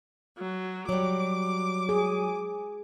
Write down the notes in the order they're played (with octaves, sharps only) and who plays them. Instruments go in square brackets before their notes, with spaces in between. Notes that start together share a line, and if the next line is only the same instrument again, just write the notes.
[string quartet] F#3
[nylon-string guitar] F#3 G3 [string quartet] D6
[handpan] G#4